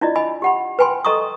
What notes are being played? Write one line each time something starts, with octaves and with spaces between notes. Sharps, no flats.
D4 E4 F4 D5 D#5
D#5 G#5 B5
G4 F#5 B5
B4 G5 G#5 B5 C6
A4 D#5 A#5 C#6 D#6